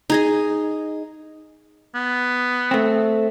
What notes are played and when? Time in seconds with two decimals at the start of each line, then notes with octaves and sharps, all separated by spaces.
0.10 D#4 G#4 D#5
1.95 B3
2.71 A3 C4